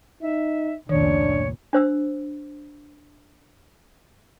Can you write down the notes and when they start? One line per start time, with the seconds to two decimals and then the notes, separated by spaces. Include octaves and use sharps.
0.21 D#4 E5
0.89 F1 C#2 A#2 D#3 D4 C#5
1.73 D4 C5 E6